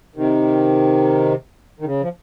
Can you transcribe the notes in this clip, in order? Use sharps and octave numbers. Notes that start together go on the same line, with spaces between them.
C3 D#3
D#3
C#3
F3